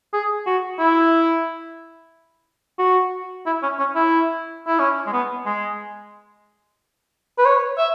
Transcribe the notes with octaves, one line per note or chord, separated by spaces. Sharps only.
G#4
F#4
E4
F#4
E4
C#4
C#4
E4
E4
C#4
G#3
B3
G#3
B4
C#5
E5